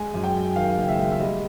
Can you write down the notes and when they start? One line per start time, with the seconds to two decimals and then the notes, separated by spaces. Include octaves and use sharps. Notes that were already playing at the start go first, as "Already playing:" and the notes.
Already playing: G#3 G#5
0.14 F#2
0.24 G5
0.34 F#2
0.56 D#3 F5
0.78 F#1
0.88 E5
0.99 G#3
1.12 E5
1.20 G3 D#5